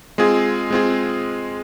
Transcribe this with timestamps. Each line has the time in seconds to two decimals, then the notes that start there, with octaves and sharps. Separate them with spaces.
0.18 G#3 C4 F4 G#4
0.71 G#3 C4 F4 G#4